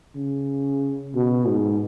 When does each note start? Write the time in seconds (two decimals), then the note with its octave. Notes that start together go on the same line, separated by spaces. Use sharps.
0.15 C#3
1.15 B2
1.48 G#2